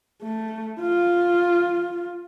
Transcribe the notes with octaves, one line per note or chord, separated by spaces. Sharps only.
A3
F4